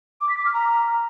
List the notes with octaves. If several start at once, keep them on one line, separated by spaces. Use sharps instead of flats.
D6
B6
D6
F6
A#5